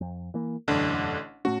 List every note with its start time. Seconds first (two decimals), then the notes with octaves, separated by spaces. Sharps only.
0.01 F2
0.34 E3 A#3
0.68 E1 A1 F#2 D3 D4
1.45 A2 A3 C#4 F#4